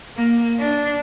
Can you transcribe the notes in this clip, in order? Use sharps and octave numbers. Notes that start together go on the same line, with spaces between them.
A#3
D4